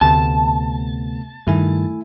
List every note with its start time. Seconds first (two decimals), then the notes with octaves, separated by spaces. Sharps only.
0.01 D2 C3 A3 B3 A5
1.47 G2 D#3 A3 E4 G#5